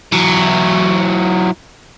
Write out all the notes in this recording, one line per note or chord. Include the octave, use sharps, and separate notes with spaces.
E3 F#3